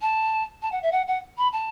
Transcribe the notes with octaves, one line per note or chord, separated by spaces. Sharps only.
A5
A5
F#5
E5
F#5
F#5
B5
A5